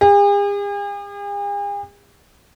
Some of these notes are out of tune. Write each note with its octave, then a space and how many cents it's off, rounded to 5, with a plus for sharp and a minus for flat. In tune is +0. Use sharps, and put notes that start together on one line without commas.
G#4 -45